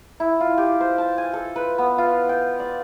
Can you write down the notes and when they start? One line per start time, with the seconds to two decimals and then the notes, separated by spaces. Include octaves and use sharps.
0.20 E4
0.40 F4
0.58 G4
0.81 C5
0.98 A5
1.18 G#5
1.33 A4
1.56 B4
1.78 B3
1.98 F4
2.29 G5
2.60 D5